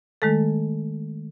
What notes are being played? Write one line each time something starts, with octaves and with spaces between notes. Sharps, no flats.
D#3 G#3 A3 A4